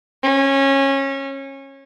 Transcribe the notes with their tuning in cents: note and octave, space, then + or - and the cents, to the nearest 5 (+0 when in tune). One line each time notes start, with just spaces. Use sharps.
C#4 -20